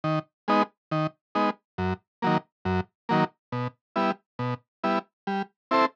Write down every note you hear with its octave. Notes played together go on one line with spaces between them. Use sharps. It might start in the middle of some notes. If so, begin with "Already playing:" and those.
D#3
G#3 B3 D#4
D#3
G#3 B3 D#4
F#2
D#3 F#3 A#3
F#2
D#3 F#3 A#3
B2
G3 B3 E4
B2
G3 B3 E4
G3
C4 E4 A4 C5